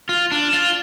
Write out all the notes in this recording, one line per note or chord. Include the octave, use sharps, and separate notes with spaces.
F4
D4
F4